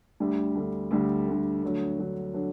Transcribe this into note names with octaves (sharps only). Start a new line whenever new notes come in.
D2 D3 G3
D2 D3 G3
D2 D3 G3
D2 D3 G3
D2 D3 F#3
D2 D3 F#3
D3 F#3